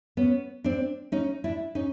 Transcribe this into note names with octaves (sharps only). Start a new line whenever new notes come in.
B3 C#4
C4 D4
C#4 D#4
D4 E4
C#4 D#4